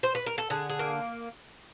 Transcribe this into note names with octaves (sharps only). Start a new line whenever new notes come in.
C5
B4
A#4
A4
D3 G#4
G#4
A#3